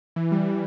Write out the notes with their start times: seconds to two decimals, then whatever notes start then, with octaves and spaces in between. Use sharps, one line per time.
0.16 E3
0.32 G3
0.46 E3